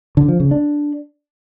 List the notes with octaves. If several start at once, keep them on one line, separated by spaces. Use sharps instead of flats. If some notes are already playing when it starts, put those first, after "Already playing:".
D3
F3
C#3
D4